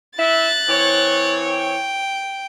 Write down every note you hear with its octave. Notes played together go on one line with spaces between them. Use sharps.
E4 E5 F#6 A6
E3 C4 C#5
G5